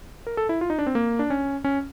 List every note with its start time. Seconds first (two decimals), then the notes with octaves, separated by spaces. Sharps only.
0.27 A#4
0.37 A4
0.49 E4
0.61 F4
0.70 D#4
0.79 D4
0.87 C4
0.95 A#3
1.19 D4
1.30 C#4
1.64 C#4